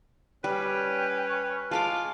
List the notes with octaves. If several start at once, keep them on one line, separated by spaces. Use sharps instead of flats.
G3 C#4 B4
G5
C#6
G#3 F4 F5 A5 D6